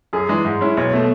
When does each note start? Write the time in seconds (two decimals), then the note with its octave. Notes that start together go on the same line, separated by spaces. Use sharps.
0.13 F#2 G#4
0.29 E3 G#3 D4
0.45 G#2
0.61 G#3 C#4 E4
0.77 B1 C#5
0.93 B2 A3